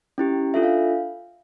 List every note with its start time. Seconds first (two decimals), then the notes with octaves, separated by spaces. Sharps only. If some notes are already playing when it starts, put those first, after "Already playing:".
0.18 C#4 E4 G4
0.54 D4 F4 A4 E5
0.63 F5